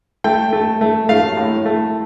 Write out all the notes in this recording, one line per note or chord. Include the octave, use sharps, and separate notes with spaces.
A3 G5
A3
A3
A3 F5
A2
A3